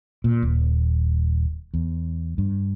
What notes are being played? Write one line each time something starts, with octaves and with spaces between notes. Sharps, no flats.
A#2
D#1
E2
G2